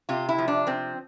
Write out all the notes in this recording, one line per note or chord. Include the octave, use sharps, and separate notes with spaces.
C3 F4
E4
F3
D4
C3 C4